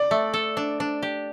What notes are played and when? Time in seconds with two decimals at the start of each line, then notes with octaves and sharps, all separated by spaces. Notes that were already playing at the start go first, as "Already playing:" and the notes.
Already playing: D5
0.11 A3
0.33 A4
0.57 D4
0.80 D4
1.03 G4